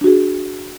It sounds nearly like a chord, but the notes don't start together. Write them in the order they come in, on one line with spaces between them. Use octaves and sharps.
D4 F#4 G#4